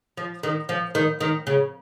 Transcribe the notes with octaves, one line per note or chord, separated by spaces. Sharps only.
F3
D#3
F3
D#3
D#3
C#3